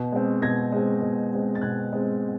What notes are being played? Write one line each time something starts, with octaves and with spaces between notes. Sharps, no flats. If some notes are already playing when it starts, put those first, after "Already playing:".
Already playing: B2
G#3 C4
B2 G#6 A#6
G#3 C4
B2
G#3 C4
A6
B2 F#6 G#6
G#3 C4